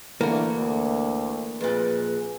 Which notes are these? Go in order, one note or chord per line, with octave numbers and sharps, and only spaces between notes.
D3 E3 A3 A#3
D2
F2 A#2 G#4 B4